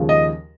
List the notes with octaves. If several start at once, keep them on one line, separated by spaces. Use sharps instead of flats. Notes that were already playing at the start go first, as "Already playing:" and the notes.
Already playing: D#2 C#3 F3 G#3
D#5